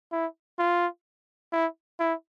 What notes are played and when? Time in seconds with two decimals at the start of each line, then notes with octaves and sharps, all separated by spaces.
0.12 E4
0.59 F4
1.52 E4
2.00 E4